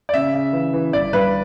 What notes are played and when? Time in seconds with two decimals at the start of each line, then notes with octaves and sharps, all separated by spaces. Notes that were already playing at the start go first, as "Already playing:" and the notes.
0.09 D5
0.13 C#3 E5
0.34 C#3
0.53 E3
0.73 E3
0.93 G1 D5
1.13 G2 B4